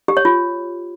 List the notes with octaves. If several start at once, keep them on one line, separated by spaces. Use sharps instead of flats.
G4
C#5
F4